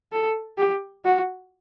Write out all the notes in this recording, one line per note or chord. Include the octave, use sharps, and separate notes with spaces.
A4
G4
F#4